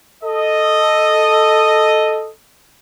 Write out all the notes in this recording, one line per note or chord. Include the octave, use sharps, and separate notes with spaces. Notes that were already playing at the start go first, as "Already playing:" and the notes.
A4 D#5